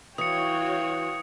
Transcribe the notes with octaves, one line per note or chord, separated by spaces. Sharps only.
E3 F#4 C#5 F5 G5 D#6 C#7